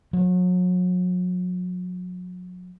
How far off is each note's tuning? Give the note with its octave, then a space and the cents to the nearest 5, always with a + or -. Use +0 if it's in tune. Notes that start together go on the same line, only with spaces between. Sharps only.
F#3 -35